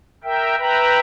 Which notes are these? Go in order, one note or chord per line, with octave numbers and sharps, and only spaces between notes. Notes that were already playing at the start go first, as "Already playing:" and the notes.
A#4 E5 G5
B4 E5 G5 A#5 B5